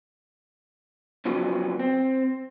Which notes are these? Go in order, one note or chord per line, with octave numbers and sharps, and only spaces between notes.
C#3 F3 F#3 B3
C4